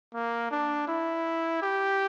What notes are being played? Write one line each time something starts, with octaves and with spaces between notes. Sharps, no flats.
A#3
D4
E4
G4